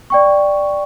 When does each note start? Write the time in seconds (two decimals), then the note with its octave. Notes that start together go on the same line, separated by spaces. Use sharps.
0.10 D5 G5 C#6